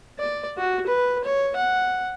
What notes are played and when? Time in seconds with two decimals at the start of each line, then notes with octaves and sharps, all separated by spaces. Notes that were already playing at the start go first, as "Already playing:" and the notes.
0.19 D5
0.57 F#4
0.86 B4
1.24 C#5
1.56 F#5